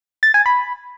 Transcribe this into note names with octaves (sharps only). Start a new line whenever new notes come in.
A6
G#5
B5